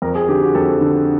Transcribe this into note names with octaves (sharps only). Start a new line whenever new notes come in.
F2 A#4
G#4
D3 G4
F#4
F2 A4
D3